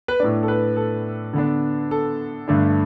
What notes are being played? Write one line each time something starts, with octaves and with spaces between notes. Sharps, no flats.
B4
A2 A3 D4 D5
A4
B4
A4
D3 B3 D4
A4
G2 D3 A3 D4